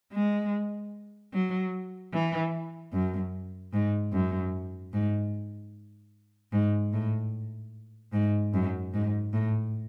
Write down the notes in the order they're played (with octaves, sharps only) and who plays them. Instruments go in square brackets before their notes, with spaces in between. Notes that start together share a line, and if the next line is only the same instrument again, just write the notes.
[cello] G#3
F#3
E3
F#2
G#2
F#2
G#2
G#2
A2
G#2
F#2
G#2
A2